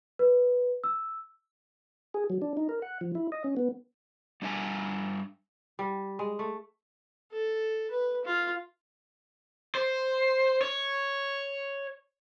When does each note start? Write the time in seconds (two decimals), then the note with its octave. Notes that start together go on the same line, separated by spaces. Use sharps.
0.19 B4
0.84 E6
2.14 G#4
2.30 F#3
2.42 D4
2.57 D#4
2.69 A#4
2.82 F#5
3.01 F3
3.15 E4
3.32 D#5
3.44 C#4
3.57 B3
4.42 G3 D4 E5 G#5
5.79 G3
6.19 G#3
6.39 A3
7.32 A4
7.91 B4
8.25 F4
9.75 C5
10.61 C#5